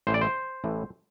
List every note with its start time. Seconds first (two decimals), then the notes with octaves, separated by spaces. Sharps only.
0.07 A1 A2 E3 C5
0.14 D5
0.21 C5
0.64 A1 A2 E3